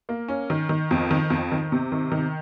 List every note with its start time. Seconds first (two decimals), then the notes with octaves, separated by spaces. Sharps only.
0.09 A#3
0.28 C#4
0.50 D#3
0.69 D#3
0.91 F2
1.11 D#3
1.30 F2
1.52 D#3
1.72 C3
1.92 D#3
2.12 D#3